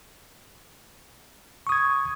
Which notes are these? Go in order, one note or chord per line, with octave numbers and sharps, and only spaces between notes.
C#6 D#6 G#6